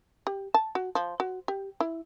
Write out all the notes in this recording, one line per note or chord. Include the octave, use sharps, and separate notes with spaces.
G4
A5
F#4
F3
F#4
G4
E4